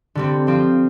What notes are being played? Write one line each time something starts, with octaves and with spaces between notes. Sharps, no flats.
D3 G3 C4
F3 C4 F4